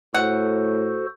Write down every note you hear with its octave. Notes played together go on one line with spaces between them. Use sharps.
A2 F#4 A4 C5 F#5